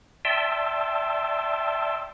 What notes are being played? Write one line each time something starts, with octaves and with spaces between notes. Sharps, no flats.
D5 E5 G5 A5 C6 E6